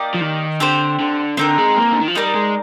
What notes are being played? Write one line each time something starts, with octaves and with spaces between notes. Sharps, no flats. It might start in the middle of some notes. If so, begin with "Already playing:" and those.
Already playing: A#3 D#4 G4 D5
F3
D#3
D3 C4 G4 C5
D3
D3 C4 D#4 A#4
G#3
A#3
D3
D#3
F3
G3 D#4 A#4 D5
G#3